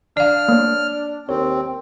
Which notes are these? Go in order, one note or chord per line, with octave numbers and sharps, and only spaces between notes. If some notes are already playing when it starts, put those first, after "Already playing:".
D4 D5 F5 F6
A#3 C#5
D#2 C4 C#5